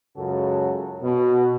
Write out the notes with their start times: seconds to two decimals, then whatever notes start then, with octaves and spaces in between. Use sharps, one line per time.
0.17 C#2 F#2 C#3 F#4 A4
1.03 B2